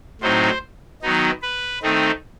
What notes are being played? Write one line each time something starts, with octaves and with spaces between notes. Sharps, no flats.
A2 F#3 C4 D#4 C5
D#3 F#3 B3 D#4
B4
D#3 A3 C4 D#4